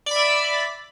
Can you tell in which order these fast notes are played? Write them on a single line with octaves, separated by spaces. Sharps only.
D5 B5 E5